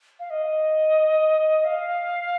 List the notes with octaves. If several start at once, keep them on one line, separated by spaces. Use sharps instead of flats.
F5
D#5
F5